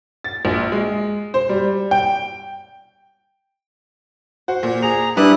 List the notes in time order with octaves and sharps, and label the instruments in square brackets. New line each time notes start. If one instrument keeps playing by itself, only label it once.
[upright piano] A6
A#1
G#3
C5
G3
G5
[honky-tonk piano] F#4 [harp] C5
[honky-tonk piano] A#2
[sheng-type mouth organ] G#4 A#5 [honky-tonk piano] F7
[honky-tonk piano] G3 B4 D5 [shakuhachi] D4 [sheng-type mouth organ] E4 D#6 F#6